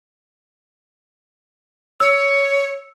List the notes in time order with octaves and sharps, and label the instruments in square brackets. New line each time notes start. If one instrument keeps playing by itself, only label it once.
[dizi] C#5 [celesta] E6